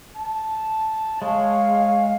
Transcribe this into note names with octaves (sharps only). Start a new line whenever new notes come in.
A5
G#3 C#5 F5